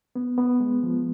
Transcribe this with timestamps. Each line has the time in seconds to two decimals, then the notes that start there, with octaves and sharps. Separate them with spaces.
0.16 B3
0.38 B3
0.60 G#3
0.83 F3